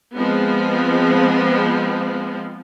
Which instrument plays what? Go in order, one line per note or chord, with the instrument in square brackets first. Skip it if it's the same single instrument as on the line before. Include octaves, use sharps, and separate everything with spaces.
[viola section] F3 G#3 B3 C4